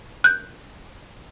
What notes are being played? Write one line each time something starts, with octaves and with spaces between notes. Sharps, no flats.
F#6 G6